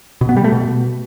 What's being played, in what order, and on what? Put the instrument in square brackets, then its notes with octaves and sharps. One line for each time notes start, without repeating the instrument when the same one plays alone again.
[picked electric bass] B2
B3
G3
A3
B2